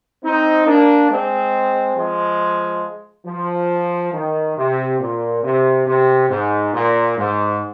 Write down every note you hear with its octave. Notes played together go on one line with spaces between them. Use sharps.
C4 D#4
A#3 D4
G#3 C4
F3 G#3
F3
D#3
C3
A#2
C3
C3
G#2
A#2
G#2